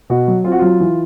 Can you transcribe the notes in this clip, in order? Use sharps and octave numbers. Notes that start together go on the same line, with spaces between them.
B2 F#4
F#3
C4 F4
F#4
F#3 F4
E3